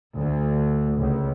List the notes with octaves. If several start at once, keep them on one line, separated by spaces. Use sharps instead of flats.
D2
C#2